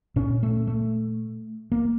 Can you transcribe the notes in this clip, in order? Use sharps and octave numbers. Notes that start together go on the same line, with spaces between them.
A#2 C#4
A3
A3
A#3